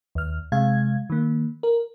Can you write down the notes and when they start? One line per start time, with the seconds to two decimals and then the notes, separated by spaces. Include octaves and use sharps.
0.15 D#2 F6
0.52 C3 G#3 F5 G#6
1.10 D#3 A#3
1.63 A#4